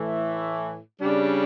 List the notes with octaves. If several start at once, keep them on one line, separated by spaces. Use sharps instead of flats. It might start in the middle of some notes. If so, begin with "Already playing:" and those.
Already playing: A2 E3 A3
C#3 G3 D4